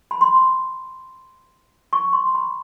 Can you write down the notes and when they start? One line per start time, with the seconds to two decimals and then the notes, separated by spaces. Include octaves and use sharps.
0.11 B5
0.21 C6
1.93 C#6
2.13 C6
2.35 B5